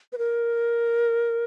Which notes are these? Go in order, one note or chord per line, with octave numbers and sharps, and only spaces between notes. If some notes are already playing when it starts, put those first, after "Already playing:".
B4
A#4